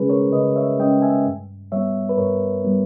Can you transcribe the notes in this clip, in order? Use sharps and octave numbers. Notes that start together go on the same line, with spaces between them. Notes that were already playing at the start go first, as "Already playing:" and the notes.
Already playing: C#3 G#3 C#4 G#4 B4
A#4 C#5
C#3 B4 D#5
C#5 E5
G#3 C#4 D#5 G5
E5 G#5
G2
G3 B3 C#5 E5
B4
G2 A#4 C#5
G3 B3